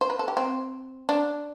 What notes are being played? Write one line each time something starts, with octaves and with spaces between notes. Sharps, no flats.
C5
B4
A4
G4
C4
D4